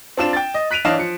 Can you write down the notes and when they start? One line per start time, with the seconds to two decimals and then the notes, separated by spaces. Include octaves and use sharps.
0.17 C4 D4 F4 E7
0.33 G5 A6
0.54 D#5
0.71 F#6 B6 D7 D#7 F7
0.85 E3 D4 C#5 D#5 F5 E7
0.99 F3 C#7